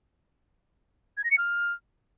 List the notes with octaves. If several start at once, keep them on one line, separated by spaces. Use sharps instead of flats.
G#6
A#6
C#7
F6